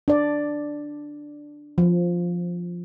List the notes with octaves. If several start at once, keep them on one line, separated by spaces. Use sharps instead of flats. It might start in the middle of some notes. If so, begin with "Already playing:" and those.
D4 D5
F3